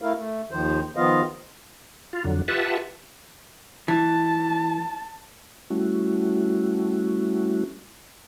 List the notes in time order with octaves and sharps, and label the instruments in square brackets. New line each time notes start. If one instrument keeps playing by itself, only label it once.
[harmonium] A3 E4 A#4 F5
A3
D#2 D#3 F3 C5
D#3 F3 B3 F4 D#5 F5
[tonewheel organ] F4
F2 D3 F#3
F4 G4 B4 E5 F#5 A5
[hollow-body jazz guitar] E3 [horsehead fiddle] A5
[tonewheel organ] G3 A3 C#4 E4 F#4